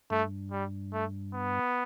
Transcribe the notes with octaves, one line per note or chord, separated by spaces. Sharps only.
G2 A3
G3
A3
B3